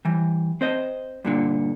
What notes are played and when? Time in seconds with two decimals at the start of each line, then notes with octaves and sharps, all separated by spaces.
0.05 E3 G3
0.61 C4 C5 D#5
1.25 G2 A#2 D3